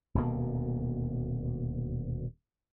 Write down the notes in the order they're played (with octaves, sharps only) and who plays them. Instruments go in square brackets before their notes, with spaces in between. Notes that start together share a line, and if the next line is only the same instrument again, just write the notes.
[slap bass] D#1 D2 B2 A#3